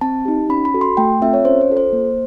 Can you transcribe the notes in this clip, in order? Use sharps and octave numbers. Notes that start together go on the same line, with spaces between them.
C4 A5
D#4 G4
C#4 B5
B5
F#4 A4
C6
A3 G5
C4 F4 A4 E5
C#5
C#4 C5
C5
F4 A4
C5
A#3